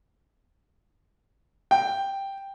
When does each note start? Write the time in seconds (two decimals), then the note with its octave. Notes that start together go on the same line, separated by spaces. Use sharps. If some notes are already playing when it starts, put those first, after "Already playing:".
1.71 G5